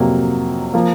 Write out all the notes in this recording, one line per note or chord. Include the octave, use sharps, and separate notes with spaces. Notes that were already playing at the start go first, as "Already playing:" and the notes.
Already playing: F2 C3 F#3 A#3
F3 A#3